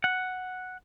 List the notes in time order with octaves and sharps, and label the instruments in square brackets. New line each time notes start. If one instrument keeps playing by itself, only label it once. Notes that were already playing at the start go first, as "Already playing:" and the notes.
[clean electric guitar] F#5